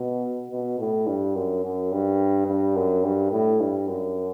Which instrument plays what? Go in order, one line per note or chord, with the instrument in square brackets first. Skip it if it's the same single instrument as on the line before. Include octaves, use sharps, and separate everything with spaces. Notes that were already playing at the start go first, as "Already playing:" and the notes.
Already playing: [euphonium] B2
B2
A2
G2
F#2
F#2
G2
G2
F#2
G2
A2
G2
F#2